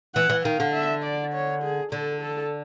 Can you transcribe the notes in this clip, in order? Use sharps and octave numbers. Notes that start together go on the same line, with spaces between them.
E3 F#5
E3
D#3 F5
D3
E5
D5
C#5
G#4
D3 A4
A4